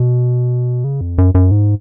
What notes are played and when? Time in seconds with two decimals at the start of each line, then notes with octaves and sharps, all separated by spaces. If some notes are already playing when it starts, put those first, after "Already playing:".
Already playing: B2
0.84 C#3
1.01 F2
1.18 F#2
1.35 F#2
1.51 G#2